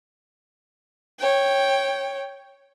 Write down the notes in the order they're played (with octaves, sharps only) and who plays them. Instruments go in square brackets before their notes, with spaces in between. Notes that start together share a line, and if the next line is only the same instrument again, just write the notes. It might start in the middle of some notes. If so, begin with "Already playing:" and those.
[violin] C#5 G5